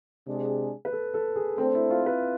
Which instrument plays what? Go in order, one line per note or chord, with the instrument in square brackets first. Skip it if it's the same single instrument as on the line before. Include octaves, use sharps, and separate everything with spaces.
[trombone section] C3 G#3 D4 G#4
[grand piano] B4
A4
A4
G#4
[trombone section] A3 D4 A4 C5 [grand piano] C4
[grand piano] E4
F4
B4